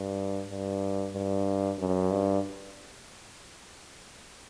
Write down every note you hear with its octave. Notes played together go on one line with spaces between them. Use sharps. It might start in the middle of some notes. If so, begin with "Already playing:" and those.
Already playing: G2
G2
G2
F#2
G2